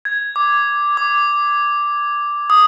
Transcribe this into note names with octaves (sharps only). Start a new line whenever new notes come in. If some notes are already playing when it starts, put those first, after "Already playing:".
G#6
D6
D6
D#6